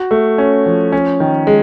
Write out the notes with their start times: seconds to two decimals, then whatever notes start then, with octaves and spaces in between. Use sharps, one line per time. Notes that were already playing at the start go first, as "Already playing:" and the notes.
Already playing: F#4
0.11 A3
0.38 C#4
0.66 F3
0.92 C#4
1.20 D#3
1.47 G#3